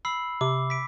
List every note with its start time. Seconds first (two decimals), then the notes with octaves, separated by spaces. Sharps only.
0.05 B5 E6 C7
0.41 C3 D6
0.70 B6 D7